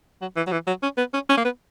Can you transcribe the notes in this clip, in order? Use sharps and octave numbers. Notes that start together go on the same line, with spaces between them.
F#3
E3
F#3
E3
F#3
C#4
B3
C#4
C#4
A#3
B3